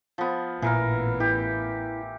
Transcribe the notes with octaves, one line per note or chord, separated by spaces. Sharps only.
F3 B3
A1 A#2 E3 B3 A#4 F5
E4 G4